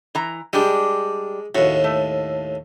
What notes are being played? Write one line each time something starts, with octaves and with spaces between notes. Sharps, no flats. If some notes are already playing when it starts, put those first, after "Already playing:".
E3 A#5
G3 G#3 D4 G4
D#2 A2 F#4
A3